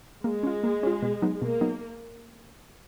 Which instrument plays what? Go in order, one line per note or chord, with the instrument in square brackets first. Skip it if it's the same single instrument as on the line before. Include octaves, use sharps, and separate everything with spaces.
[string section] G#3 [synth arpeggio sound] A#3
[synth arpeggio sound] C#4 F4
A#3
C#4 F4
B2
F#3 B3 D#4
[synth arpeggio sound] B2 [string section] A#3
[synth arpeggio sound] F#3 B3 D#4